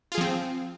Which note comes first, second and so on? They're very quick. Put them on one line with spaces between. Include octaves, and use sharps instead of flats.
F4 G#4 F3 C4